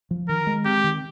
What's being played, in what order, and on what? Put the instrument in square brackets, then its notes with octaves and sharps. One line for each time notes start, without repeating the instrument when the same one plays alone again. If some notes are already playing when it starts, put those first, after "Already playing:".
[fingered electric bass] F3
[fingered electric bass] D#3 [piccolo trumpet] A#4
[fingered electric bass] G#3
[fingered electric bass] C4 [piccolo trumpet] G4
[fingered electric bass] D#3